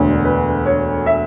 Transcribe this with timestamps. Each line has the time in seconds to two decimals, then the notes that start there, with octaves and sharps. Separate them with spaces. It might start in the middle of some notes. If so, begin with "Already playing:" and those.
Already playing: E1 D2 D3 C#5
0.25 B4
0.66 C#5
1.06 E5